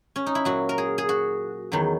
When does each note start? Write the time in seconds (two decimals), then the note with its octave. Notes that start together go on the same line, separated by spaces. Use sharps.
0.16 C#4
0.26 D#4
0.35 E4
0.45 A#2 F#3 F#4
0.69 A#4
0.78 G#4
0.98 G#4
1.09 F#4
1.72 E2 D#3 F#3